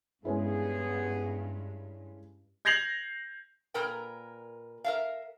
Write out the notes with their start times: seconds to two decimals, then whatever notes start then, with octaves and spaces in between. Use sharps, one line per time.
0.25 G2 G#3 B3 C#4 E4 G#4
2.65 G6 G#6 A#6 C7 F7 F#7
3.74 A#2 A#4 B4 G5
4.84 A#4 E5 F5